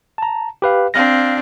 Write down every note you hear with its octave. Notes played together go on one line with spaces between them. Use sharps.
A5 A#5
G4 B4 F5
C4 D4 F5 F6 A#6